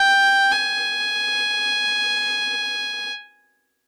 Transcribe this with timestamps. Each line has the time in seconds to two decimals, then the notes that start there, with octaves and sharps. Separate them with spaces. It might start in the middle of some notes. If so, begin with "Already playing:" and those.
Already playing: G5
0.51 G#5